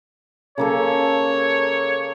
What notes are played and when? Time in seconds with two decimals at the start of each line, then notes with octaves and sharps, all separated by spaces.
0.58 C#3 A#3 A4 C#5